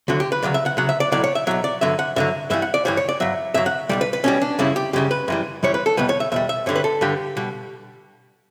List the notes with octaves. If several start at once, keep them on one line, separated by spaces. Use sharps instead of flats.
D2 D3 F#3 F#4
G4
B4
D2 C#3 F#3 D5
E5
F#5
D2 C#3 F#3 F#5
E5
D5
B1 A2 F#3 D5
C#5
E5
B1 A2 F#3 E5
D5
G2 D3 F#3 E5
F#5
G2 D3 F#3 E5
G2 E3 G3 E5
F#5
D5
G2 E3 G3 C#5
C#5
D5
G2 F#3 E5
G2 F#3 E5
F#5
B1 B2 G3 D5
B4
B4
B1 B2 G3 C#4
D4
F#2 C#3 G3 E4
G4
F#2 C#3 G3 G4
B4
F#2 E3 G3
F#2 E3 G3 C#5
B4
A4
E2 B2 G3 B4
C#5
E5
E2 B2 G3 E5
E5
G2 D3 G3 C#5
B4
A4
G2 D3 G3 G4
B2 G3